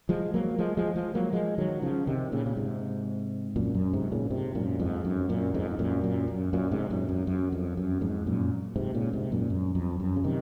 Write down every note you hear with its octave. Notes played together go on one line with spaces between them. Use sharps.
F3 G#3
F#3 A#3
F3 G#3
F3 G#3
F3 G#3
F#3 A#3
F3 G#3
D#3 F#3
C#3 F3
C3 D#3
A#2 C#3
C#3
G#2 C3
F#2 A#2
F#2
G#2 C3
A#2 C#3
G#2 C3
F#2 A#2
F2 G#2
F#2
F#2 A#2
F2 G#2
G#2
F#2 A#2
F#2 A#2
F#2
F#2 A#2
G#2 C3
F#2 A#2
F#2
F#2
F2
F#2
F2 G#2
F#2 A#2
G#2 C3
A#2 C#3
G#2 C3
F#2 A#2
F#2
F2
F#2
C#3
C3 D#3